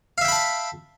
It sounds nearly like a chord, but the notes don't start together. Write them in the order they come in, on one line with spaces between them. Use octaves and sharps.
F5 E5 G5 B5 A5